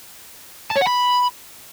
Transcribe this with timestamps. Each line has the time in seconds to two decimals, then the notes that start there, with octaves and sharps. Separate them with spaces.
0.71 A5
0.77 C#5
0.82 F#5
0.87 B5